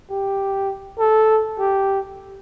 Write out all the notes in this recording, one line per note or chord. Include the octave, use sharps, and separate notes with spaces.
G4
A4
G4